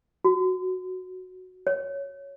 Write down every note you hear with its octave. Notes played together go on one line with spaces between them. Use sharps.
F#4
C#5